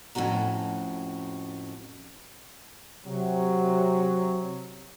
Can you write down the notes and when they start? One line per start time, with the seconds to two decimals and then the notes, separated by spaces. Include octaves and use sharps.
0.15 F2 A2 C#4 F#4 A#5
3.07 C3 F#3